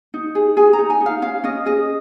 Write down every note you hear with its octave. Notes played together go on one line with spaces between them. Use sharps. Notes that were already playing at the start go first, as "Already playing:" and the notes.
D#4
G#4
G#4 G#5
A#5
D#4
G#5
D#4
F5
C#4 F5
C#4 D#5
G#4 D#5